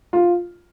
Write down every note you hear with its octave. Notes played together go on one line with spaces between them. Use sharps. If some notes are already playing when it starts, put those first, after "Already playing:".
F4